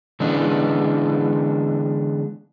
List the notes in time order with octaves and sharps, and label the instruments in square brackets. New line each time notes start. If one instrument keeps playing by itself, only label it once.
[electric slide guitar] D3 E3 G#3 B3 C#4 D4